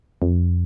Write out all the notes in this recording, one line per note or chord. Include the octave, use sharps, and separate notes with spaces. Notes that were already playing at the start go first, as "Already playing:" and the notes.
F2